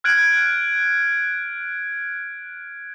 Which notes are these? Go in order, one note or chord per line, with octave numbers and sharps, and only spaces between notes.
F6 F#6 G#6 D7 F#7